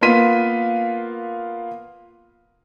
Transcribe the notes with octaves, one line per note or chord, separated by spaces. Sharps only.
A#3 B3 F4 C6 B6 D#7